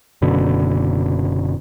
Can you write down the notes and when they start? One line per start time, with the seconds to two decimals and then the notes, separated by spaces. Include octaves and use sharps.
0.22 F#1 F#2 B2 D3